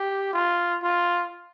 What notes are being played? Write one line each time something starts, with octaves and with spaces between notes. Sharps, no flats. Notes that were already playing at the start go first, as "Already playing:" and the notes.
Already playing: G4
F4
F4